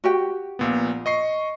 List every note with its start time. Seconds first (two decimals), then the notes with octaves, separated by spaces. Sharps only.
0.04 F#4 G4 G5
0.59 A#1 A#2 B3
1.06 D#5 C#6 C7